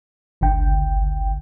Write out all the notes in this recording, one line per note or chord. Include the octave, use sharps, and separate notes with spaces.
G1 C#2 D3 G5